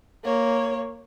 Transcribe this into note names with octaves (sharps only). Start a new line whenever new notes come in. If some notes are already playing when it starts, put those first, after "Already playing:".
A#3 C#5